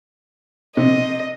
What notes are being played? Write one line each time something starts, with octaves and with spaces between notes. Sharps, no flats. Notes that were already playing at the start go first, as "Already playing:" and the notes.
C3 D#5